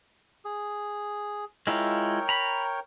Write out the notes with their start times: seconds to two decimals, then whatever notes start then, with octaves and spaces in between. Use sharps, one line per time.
0.45 G#4
1.67 G#3 E4 F4 A#4 C#5 G5
2.29 A#5 B5